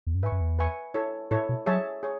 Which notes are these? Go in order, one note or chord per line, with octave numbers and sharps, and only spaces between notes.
E2
F#2
G#2 B4 E5 G#5 C#6
F#2
E2
B4 E5 G#5 C#6
E4 A4 C#5
A2 E4 A4 C#5
B2
F#3 G#4 C#5 E5 A5
G#4 C#5